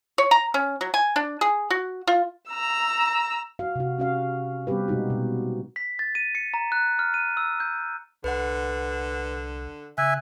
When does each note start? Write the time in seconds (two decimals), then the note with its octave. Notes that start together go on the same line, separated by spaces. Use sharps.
0.18 C#5
0.31 A#5
0.54 C#4
0.81 F#3
0.94 G#5
1.16 D4
1.41 G#4
1.70 F#4
2.07 F4
2.49 A#5 E6
3.59 F#4 F5
3.76 C3 F#4
3.98 C#4 F#4 F5
4.67 G3 B3 C4 G4 B4
4.88 B2 G#3 D#4 F#4
5.10 B2
5.76 B6
5.99 A6
6.15 D#7
6.35 C#7
6.54 A#5
6.72 F#6
6.99 F6
7.14 D#7
7.37 E6
7.60 G6
8.24 C2 D3 B4 F#5
9.98 C#3 E5 G#5 F#6